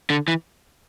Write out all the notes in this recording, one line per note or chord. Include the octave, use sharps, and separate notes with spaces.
D3
E3